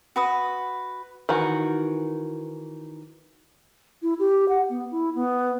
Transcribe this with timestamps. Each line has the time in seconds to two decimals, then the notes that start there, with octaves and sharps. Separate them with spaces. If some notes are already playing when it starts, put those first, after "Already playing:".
0.16 F#4 B4 D#6
1.29 D#3 E3 F#4
4.02 E4
4.19 G4
4.49 F#5
4.69 B3
4.91 E4
5.15 B3